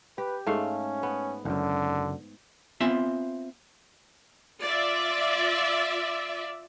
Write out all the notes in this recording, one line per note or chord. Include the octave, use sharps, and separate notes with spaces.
G4 B4
G#2 A3 C#4 F5
B3
F#1 F#2 D3
B3 C4 F4 E5 G#5
F4 D5 E5